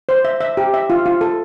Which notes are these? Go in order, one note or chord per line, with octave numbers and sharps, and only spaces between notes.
C5
E5
E5
G4
E5
F4
F4
A4